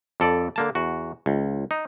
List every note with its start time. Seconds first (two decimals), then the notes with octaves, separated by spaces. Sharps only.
0.20 F2 A4 D5
0.56 D3 A#3 A5
0.75 E2 F#4
1.26 C#2
1.71 D#4